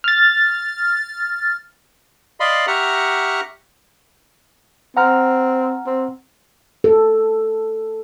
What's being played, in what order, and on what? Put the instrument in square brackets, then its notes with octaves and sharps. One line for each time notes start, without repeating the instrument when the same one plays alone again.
[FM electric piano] F6 A6
[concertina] D5 D#5 F5 B5 C6
G4 E5 F#5 A#5 C#6 F6
[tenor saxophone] C4 [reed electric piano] F#5 A#5 F6
[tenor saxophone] C4
[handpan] A4